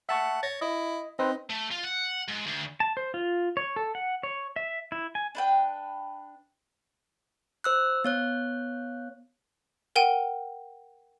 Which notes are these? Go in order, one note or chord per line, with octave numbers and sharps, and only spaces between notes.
E5 F#5 A5 C#6
C#5 A6 A#6
E4 D#5
C4 D#4 B4 C5
A3
F4
F#5
G#2
D2
A5
C5
F4
C#5
A4
F#5
C#5
E5
E4
G#5
D4 B4 G5
C5 E6 F#6
B3 C#5 F#6
A#4 F#5 G5 D#7